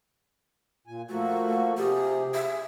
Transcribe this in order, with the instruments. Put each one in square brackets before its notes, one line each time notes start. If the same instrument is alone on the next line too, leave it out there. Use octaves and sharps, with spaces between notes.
[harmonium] A#2 G#5
[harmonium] F3 A#3 F#4 [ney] A3
[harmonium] C3 G#4 [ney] G4
[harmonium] G#4 [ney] E5